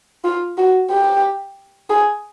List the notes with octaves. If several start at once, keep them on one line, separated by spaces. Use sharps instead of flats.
F4
F#4
G4
G#4